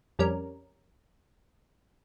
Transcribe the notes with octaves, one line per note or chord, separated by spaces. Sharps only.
F2 G3 C#4 A#4